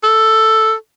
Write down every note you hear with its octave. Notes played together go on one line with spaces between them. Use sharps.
A4